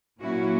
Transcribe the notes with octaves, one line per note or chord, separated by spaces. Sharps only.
A#2 F#3 A#3 C#4 E4 F#4